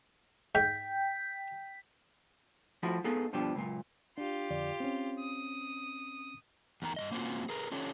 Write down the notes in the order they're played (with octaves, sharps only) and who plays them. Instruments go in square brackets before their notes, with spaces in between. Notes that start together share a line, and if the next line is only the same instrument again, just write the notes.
[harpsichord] G#2 [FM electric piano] G5 [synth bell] G6 [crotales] B6
[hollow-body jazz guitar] F3 A3 E4 F#4
A#3 B3 D#4 G#4 A4
G2 B2 F3 D4 G4
C#2 F#2 A#2
[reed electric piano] D4 [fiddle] F4 G4
[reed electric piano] F2 D3 D5
C4 C#4
[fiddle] D#6
[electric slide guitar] E2 D#3 A#5
G2 E3 D#5
A#3 C4 C#4 F4 F#4
G#4 A#4 B4
C#4 D4 F4 G4 A4 C#5